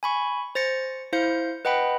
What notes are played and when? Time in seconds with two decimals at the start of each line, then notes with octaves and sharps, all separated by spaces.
0.03 G#5 B5 C#6
0.55 C5 A6 A#6 C#7
1.13 E4 C5 F5 G6 C#7
1.65 B4 D#5 F#5 G5 B5